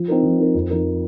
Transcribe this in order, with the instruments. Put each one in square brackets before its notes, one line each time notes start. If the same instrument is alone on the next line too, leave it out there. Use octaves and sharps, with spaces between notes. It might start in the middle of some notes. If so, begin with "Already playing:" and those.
Already playing: [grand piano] F3
C4 D#4 A#4
F3
C4 D#4 A#4
F2
F3 D#4 A#4